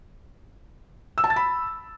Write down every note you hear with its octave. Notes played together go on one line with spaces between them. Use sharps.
E6
A5
A6
B5